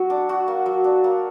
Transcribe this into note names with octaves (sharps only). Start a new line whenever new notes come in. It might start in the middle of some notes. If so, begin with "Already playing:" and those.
Already playing: F#3 F#4
D4
F#4
A#3
F#3
D4
A#3